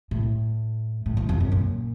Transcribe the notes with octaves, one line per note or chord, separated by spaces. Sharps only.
A2
A2
F#2
F2
F#2
A#2